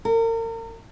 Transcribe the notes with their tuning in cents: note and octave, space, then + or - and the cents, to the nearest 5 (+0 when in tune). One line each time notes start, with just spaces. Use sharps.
A#4 -40